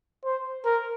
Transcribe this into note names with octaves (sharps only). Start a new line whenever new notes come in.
C5
A#4